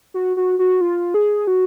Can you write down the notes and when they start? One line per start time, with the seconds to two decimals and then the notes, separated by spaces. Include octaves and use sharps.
0.14 F#4
0.37 F#4
0.59 F#4
0.81 F4
1.14 G#4
1.47 F#4